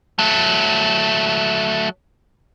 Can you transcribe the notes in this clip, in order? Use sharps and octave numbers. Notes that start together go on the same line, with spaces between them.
F#3 A3